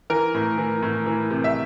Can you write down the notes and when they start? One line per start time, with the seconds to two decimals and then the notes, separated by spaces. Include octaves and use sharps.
0.10 E3 A#4
0.34 A2
0.58 E3
0.82 A2
1.07 E3
1.31 C3
1.44 E5